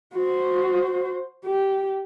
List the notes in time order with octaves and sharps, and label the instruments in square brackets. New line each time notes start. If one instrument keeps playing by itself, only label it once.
[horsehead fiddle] F#4 C5
G4